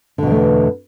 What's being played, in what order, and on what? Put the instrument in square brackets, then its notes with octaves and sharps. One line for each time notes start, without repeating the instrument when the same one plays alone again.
[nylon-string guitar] D3
B2
E2
A3